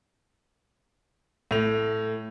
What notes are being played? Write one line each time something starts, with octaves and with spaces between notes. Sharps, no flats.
A2 F7